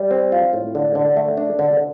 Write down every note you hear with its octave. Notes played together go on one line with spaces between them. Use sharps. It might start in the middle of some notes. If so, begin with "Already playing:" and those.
Already playing: G3
C4
F4
A2
D3
D3
A3
D4
D3